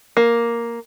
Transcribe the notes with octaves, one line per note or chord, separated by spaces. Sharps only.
A#3